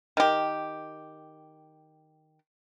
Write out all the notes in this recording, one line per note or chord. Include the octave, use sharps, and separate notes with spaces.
D#3 G4